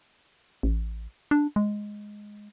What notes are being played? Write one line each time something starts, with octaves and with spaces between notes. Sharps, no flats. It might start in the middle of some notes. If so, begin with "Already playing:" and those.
A1
D4
G#3